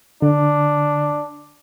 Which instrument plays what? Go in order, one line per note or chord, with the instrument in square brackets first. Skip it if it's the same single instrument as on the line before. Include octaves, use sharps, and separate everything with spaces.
[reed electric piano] D3 [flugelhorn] D4